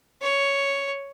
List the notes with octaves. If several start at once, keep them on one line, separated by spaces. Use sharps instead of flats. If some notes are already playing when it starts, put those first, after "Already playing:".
C#5